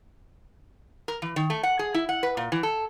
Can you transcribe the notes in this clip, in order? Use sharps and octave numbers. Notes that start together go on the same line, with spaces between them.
A#4
E3
D#3
A3
F#5
G#4
E4
F#5
B4
A#2
E3
A4